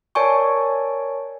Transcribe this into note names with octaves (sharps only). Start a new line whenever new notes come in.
A#4 C#5 D5 G#5 A5 C#6